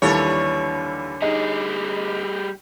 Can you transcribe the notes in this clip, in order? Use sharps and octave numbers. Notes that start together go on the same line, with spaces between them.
D#2 D3 E3 G3 A4 C#5
G3 D#4 G#4